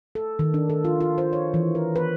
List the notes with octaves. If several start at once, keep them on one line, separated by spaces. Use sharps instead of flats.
A4
D#3
D4
A4
F4
F4
C5
C#5
E3
A#4
B4